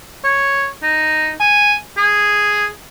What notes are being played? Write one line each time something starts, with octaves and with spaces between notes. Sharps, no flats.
C#5
D#4
G#5
G#4